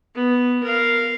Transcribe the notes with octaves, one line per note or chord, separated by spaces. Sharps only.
B3
A#4 F5